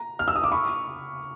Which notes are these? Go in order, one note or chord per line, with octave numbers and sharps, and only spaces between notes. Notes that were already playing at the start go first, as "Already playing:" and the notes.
Already playing: A#5
F6
E6
D#6
D6
B5 C#6